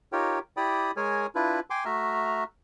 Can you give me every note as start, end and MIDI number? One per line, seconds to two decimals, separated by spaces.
0.12 0.39 63
0.12 0.39 65
0.12 0.39 67
0.12 0.39 70
0.12 0.39 73
0.12 0.39 79
0.57 0.91 64
0.57 0.91 67
0.57 0.91 74
0.57 0.91 79
0.57 0.91 83
0.57 0.91 87
0.96 1.27 56
0.96 1.27 68
0.96 1.27 70
0.96 1.27 73
0.96 1.27 80
1.35 1.60 62
1.35 1.60 64
1.35 1.60 65
1.35 1.60 71
1.70 1.84 79
1.70 1.84 80
1.70 1.84 84
1.70 1.84 86
1.85 2.44 57
1.85 2.44 66
1.85 2.44 76
1.85 2.44 82
1.85 2.44 89